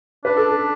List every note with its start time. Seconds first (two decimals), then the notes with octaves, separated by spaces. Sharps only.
0.25 D4 B4
0.37 A4
0.49 A4